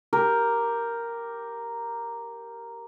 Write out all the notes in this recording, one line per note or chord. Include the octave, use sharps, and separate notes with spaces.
G4 A#4